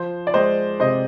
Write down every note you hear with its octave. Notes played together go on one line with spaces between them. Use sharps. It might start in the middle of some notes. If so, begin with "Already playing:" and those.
Already playing: F3 C5
D5
G#3 C5 D#5
C3 C5 D#5